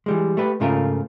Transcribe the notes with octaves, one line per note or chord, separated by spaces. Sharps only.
E3 G3 G#3
A3 G4 B4
C#2 G#2 C#3 A3 F4 A#4